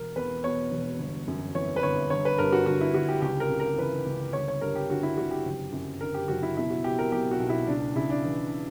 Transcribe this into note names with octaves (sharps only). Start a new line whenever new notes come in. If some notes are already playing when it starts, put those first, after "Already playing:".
Already playing: E1 A#4
E2 B4
B2 C#5
E1
G1
F#2
E3 C#5
B4
G1 C#5
G1 C#5
B4
G2 A#4
F#4
D3 F#4
E4
G1 F#4
G4
C#2 G4
A#4
C#3
A#4
E3 B4
C#2
G1 C#5
C#5
G2 A#4
G4
D3 F#4
E4
G1 F#4
G4
F#1
F#2
D3 A#4
G4
F#1 F#4
E4
B2 E4
F#4
B2 G4
A#4
B1 G4
F#4
B1
E4
C#2 D4
C#3 E4
D4
E3